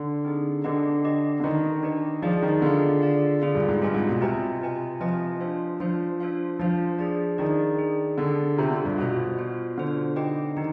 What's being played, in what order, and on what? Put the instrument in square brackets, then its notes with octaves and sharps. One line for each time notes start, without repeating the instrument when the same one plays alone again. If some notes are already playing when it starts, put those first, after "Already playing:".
Already playing: [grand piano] D3
[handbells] C4 D#4 G#4
[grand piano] D3 [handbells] D4 G4 B4 D#5
[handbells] D4 G4 B4 D#5
[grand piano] D3
[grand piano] D#3 [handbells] D4 G4 B4 D#5
[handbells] D4 G4 B4 D#5
[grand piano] F3 [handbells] F4 G#4 D5 F5
[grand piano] D#3
[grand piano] D3 [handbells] F4 G#4 D5 F5
[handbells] F4 G#4 D5 F5
[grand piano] D3 [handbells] F4 G#4 D5 F5
[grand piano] G2
G#2
[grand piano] G2 [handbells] C4 F4 B4 D#5 G#5
[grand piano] G#2
B2
[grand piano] C3 [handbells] C4 F4 B4 D#5 G#5
[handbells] C4 F4 B4 D#5 G#5
[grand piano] F3 [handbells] C4 F4 B4 D#5 G#5
[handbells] D4 F4 C5 F5
[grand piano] F3 [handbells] D4 F4 C5 F5
[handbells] D4 F4 C5 F5
[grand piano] F3 [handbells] D4 F4 C5 F5
[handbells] D4 G#4 D5
[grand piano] D#3 [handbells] D4 G#4 D5
[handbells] D4 G#4 D5
[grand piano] D3 [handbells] D4 G#4 D5
[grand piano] C3 [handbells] B3 F4 C5
[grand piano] D3
G2
[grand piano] B2 [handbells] B3 F4 C5
[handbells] B3 F4 C5
[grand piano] D3 [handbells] B3 F4 C5
[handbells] D#4 G4 B4 D#5 G5
[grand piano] D#3 [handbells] D#4 G4